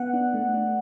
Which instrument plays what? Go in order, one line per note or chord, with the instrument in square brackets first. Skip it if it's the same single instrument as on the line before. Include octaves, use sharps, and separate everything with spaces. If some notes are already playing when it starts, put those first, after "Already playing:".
Already playing: [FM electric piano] B3 F#5
D4
A3
D4